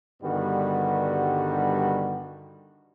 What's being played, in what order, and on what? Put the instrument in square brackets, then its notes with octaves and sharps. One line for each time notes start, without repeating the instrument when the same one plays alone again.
[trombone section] G2 D3 D#3 G3 B3 F#4